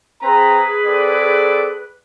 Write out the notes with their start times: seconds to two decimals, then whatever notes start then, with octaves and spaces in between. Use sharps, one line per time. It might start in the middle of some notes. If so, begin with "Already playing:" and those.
0.22 C4 G#4 B4 A#5
0.85 C4 A4 D5